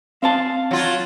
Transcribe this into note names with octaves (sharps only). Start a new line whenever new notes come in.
C4 C5 F5 A5
F#3 F4